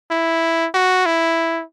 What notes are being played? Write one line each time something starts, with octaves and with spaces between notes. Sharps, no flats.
E4
F#4
E4